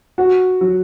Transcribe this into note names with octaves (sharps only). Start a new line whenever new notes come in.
F#4
F#3